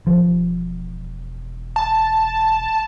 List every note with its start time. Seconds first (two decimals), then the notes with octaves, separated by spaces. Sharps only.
0.07 E1 F3
1.76 A5